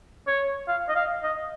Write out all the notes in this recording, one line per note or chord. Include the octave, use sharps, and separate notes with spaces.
C#5
F5
D#5
F5
D#5